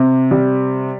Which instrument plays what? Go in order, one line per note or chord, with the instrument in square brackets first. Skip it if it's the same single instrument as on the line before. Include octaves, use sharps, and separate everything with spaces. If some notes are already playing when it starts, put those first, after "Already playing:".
Already playing: [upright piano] C3
G3